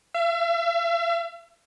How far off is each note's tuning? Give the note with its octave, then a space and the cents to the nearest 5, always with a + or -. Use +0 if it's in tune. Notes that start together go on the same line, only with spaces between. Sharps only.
E5 +45